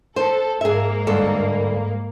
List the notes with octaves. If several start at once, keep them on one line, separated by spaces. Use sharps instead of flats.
A4 C5
G#2 A#3 G#4 E5
D2 G2 A4